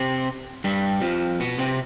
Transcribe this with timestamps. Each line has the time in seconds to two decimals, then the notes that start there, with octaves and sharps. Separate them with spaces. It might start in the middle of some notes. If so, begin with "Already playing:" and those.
Already playing: C3 C4
0.64 G2 G3
1.01 F2 F3
1.40 B2 B3
1.58 C3 C4